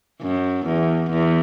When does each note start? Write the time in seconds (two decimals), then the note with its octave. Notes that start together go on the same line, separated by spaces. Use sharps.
0.22 F#2
0.66 E2
1.10 E2